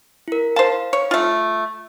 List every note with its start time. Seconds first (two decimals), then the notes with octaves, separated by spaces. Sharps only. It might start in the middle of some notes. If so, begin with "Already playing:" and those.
0.28 E4 A#4
0.56 C5 F5 A5
0.93 C#5
1.11 A3 F4